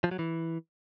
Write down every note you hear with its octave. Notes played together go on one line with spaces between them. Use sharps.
F3
F#3
E3